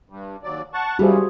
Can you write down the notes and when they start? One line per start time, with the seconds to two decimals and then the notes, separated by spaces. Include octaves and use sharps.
0.09 G2
0.43 D#2 F#3 D5
0.74 F#5 A5 C#6
0.99 F#2 E3 F3 G3 F#4 G#4 C5